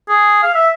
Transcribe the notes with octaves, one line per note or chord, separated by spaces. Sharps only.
G#4
F5
E5